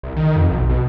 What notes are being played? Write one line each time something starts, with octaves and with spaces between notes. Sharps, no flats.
C2
D#3
F2
B1
B2